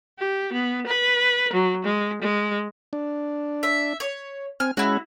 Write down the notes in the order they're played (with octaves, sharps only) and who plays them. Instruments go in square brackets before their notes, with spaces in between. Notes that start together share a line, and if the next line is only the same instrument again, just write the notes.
[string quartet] G4
B3
B4
F#3
G#3
G#3
[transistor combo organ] D4
[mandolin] E5
C#5
[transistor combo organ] C4 G#5 [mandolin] F6
[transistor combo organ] G#3 C#4 [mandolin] E4 F#4